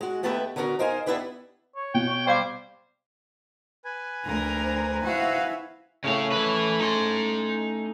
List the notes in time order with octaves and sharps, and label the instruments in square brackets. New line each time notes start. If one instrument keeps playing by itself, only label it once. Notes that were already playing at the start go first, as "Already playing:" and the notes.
[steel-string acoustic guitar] G#3 F#4
D#2 A3 B3 G4 B4 E5
D3 B3 C#4 F#4 A4 A#4
D#4 A#4 C5 F5 G#5
B3 D4 E4 G4 B4 D#5
[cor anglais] C#5
[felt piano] B2 [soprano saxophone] G5
[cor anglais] C#5
[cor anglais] G3 [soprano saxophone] C5 [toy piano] D5 F5 D6
[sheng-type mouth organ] B4 G#5
[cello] D2 A#4 [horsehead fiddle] D4 A#5
[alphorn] C5
[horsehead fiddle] E4 E5 [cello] F#4 F5
[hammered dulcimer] A2 C#4 [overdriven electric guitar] C#3 F5
[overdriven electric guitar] E3 B4
D#4 C6